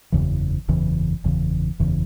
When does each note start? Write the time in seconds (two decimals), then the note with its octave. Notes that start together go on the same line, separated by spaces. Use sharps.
0.12 F#1 E2 C#3 E3
0.68 F#1 E2 C#3 E3
1.24 F#1 E2 C#3 E3
1.80 F#1 E2 C#3 E3